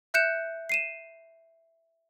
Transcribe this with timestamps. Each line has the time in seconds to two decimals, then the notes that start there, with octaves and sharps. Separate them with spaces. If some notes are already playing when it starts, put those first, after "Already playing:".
0.14 E5 F#6 G6 C#7 E7
0.69 C7 D#7 E7